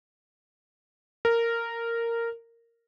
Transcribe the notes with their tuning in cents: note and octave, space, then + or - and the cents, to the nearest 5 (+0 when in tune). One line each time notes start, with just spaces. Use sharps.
A#4 -10